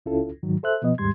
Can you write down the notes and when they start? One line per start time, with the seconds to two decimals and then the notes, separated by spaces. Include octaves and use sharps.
0.06 C#2 C#4 E4 F4 A4
0.43 G#2 D#3 F#3
0.63 A4 C5 E5 F#6
0.82 B2 F3 B3 D#5
0.98 D#2 G#2 G3 C6 G#6